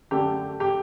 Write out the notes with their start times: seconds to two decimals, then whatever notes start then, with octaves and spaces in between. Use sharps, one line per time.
0.11 F#2 D3 A3 G4
0.60 G4